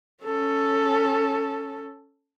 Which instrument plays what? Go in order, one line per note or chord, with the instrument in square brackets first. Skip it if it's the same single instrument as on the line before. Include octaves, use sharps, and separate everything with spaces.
[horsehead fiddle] C#4 A4